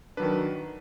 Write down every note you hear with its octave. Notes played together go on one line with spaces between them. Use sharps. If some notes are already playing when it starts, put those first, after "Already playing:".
D#3 F#3 D4 B4